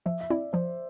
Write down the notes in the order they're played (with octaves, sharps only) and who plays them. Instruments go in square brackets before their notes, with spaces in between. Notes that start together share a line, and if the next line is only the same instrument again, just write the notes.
[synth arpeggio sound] F3 [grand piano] E5
[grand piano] E5
[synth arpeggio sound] C4 E4 [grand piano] D5
[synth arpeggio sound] F3 [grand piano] C5